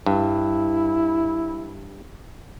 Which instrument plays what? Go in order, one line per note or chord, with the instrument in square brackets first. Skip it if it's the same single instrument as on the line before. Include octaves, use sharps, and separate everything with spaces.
[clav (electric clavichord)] G2 [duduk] E4